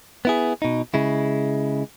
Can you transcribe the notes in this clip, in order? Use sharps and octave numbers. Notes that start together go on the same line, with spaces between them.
B3 E4 G#4
B2 D#4
C#3 G#3 E4